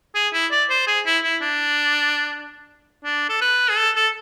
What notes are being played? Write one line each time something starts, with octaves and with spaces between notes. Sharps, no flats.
G#4
E4
D5
C5
G#4
E4
E4
D4
D4
A4
B4
G#4
A4
A4